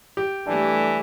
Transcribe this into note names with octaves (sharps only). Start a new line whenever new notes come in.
G4
E3 G3 A3 D4